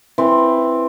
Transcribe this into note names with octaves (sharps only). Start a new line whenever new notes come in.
E3 C4